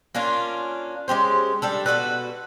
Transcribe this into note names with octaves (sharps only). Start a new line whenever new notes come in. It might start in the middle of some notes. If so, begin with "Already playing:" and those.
A#3 C#4 D4 F4
G#3 C#4 G4 C5
G3 D4 A4
B2 F#4 A4 B4